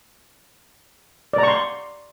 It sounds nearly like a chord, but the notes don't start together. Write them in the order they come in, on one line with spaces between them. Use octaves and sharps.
D5 A#5 C#6 C6